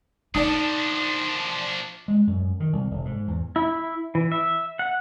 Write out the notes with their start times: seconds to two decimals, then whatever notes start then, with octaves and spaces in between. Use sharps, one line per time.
0.35 F3 D4 D#4 D5 A5 D#6
2.08 G#3
2.27 F#2
2.60 D#3
2.73 C2
2.91 F1
3.05 G#2
3.28 E2
3.56 E4
4.15 E3
4.32 E5
4.79 F#5